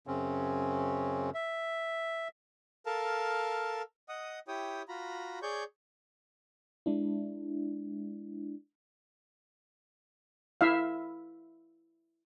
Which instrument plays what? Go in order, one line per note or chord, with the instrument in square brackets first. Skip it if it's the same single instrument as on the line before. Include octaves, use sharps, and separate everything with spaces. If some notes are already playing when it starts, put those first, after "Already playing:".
[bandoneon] F#2 C#3 C4 C#4
E5
[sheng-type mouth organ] A4 A#4 F5 A5
D#5 F#5 D#6
E4 G4 C#5 G5 D#6
F4 F#4 A#5 B5
G#4 C#5 D5 C#6 G6
[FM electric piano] G#3 D4 E4
[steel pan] E4 E5 F5